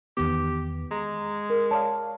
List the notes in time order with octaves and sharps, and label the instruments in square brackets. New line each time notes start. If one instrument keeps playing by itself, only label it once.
[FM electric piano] E2 D#3 B3 [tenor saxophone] G4
[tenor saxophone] G#3 [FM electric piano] A#5
[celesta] A#4
[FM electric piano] C#5 D5 F5 [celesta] A5